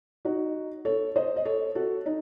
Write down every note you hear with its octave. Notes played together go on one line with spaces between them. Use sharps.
D#4 F#4
A4 C#5
C5 D#5
D#5
A4 C#5
F#4 A4
D#4